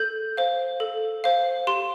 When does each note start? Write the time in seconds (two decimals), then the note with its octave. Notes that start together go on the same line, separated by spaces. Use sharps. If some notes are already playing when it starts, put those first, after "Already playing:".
Already playing: A4 G6
0.37 C5 F5
0.80 A4
1.24 C5 F5
1.67 G4 C6